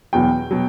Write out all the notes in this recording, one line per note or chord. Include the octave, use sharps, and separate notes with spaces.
E2 B2 F#3 G5
B2 F#3